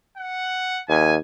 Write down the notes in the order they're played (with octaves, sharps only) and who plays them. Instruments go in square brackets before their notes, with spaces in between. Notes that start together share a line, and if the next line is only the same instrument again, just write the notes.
[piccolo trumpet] F#5
[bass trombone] D#2 [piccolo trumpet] G#5